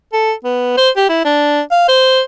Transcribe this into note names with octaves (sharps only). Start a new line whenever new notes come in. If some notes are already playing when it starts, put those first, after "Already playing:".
A4
B3
C5
G4
E4
D4
F5
C5